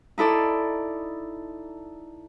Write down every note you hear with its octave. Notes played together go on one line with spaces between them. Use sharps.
D#4 E4 A4 D5